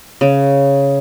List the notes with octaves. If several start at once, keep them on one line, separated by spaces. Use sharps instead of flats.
C#3